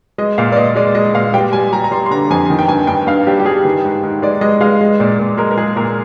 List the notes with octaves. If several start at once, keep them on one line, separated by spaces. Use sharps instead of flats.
G#3 D#5
A#2 F5
D5
A#2 D#5
G#3 D5
G#3 D#5
A#2 F5
G3 G5
G3 G#5
G3 A#5
A#5
G3 C6
C6
D3 A#5
F2 G#5
D#3
G5
G2 G#5
G2 G5
G2 F5
G3 G4
G4
G3 G#4
D#3
G#2
G#2
G#3 D5
G#3 D#5
G#3 F5
G#3
A#2 D5
A#2
G#3 A#4
A#4
G#3 G#4
A#2 A#4